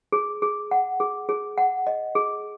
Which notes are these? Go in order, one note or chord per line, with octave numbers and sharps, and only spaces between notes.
G#4
G#4
F#5
G#4
G#4
F#5
D#5
G#4